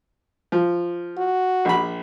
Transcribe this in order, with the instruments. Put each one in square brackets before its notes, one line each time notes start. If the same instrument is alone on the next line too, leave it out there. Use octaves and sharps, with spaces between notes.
[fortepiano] F3
[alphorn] F#4
[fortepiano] A#1 B5